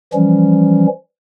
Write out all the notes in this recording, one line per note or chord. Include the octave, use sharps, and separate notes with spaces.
E3 F3 G3 C#4